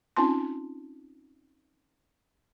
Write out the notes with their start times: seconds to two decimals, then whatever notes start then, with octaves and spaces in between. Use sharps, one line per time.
0.16 C4 C#4 D#4 F4 A5 C6